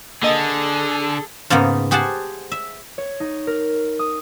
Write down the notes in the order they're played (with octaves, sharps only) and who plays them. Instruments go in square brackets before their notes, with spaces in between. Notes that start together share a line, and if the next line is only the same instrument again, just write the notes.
[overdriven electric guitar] D3 [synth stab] A#3 D#5 A6 [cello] G#4 A4
[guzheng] G#2 C#3 A#3 B3 D#4
G4 G#4 C5 F#5 G#5 A5
E5
[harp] C#5
D#4
A#4
D#6